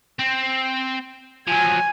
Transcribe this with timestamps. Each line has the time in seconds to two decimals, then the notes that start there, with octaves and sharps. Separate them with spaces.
0.19 C4
1.47 F3 F#3 G#5